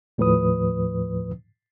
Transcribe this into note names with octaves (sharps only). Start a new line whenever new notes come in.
D#2 A2 F3 B4 D#6